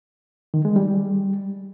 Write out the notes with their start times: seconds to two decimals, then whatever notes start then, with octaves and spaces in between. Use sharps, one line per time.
0.54 D#3
0.65 G#3
0.76 G3